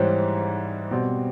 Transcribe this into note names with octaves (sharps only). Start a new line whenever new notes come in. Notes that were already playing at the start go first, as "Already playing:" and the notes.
Already playing: G#2 E3 G3 C5 C#5
B2 G3 C4